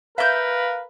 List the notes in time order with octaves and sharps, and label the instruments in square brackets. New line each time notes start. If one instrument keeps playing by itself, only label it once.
[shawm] A#4 [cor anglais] B4 [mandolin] E5 G6 [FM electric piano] F5